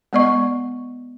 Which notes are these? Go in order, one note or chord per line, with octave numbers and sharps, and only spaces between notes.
G#3 B3 D5 D#5 C#6